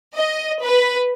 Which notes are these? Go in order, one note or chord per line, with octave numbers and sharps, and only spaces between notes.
D#5
B4